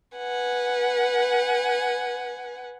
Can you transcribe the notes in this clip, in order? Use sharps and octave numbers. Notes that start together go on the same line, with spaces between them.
B4 F#5 G#5